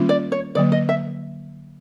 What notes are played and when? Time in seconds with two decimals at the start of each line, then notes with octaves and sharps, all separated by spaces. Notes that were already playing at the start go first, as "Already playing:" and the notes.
Already playing: D#3 G3 A#3 C#4 F4
0.09 D5
0.32 C#5
0.55 D3 F#3 A#3 D5
0.72 D#5
0.89 E5